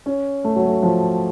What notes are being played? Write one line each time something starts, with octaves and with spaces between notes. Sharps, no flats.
C#4
A3
F#3
A3
F3